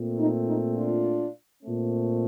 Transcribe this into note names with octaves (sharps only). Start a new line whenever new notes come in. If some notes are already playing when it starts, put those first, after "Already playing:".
Already playing: A#2 A3 C4
D#4
D#4
D4 F4
A#2 A3 C4